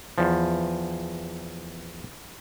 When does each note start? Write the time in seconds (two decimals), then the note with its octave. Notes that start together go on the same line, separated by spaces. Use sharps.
0.18 E2 F3